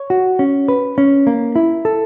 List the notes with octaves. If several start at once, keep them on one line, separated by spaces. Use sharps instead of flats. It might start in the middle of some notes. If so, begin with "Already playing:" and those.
Already playing: C#5
F#4
C#4
B4
C#4
A#3
E4
A4